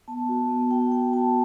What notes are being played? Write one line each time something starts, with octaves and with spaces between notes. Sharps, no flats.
B3 A5
F#4
B3
F#4 G5
B3 G5
F#4 A5